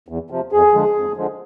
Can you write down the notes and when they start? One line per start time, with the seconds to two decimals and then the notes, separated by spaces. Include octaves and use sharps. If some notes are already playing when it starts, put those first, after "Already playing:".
0.08 E2
0.30 C3 F3
0.52 F2 G#4
0.73 D3 F3 G#3
0.95 F2
1.17 D3 F3 G#3